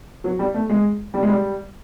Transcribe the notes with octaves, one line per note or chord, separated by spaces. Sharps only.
F#3
G3
A3
G#3
G3
G#3
G3